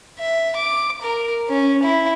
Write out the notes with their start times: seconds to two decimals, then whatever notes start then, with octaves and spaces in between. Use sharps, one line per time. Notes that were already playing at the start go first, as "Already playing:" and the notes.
0.19 E5
0.56 D6
1.01 A#4
1.49 C#4
1.83 E4